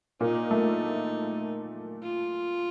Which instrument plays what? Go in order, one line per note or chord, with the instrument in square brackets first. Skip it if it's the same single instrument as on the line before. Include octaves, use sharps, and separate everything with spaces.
[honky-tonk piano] A#2 A#3 [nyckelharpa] D#4
[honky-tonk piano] A3
[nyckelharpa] F4